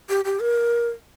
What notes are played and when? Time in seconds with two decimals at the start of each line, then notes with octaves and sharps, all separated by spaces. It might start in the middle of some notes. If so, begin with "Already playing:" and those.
0.09 G4
0.25 G4
0.40 A#4